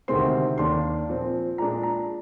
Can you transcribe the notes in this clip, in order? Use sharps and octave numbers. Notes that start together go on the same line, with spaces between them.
D2 C3 D#3 G#3 C4 C6
D#2 D#3 A#3 D4 C6
A#2 F3 C4
A#2 G#3 D4 A#5
A#5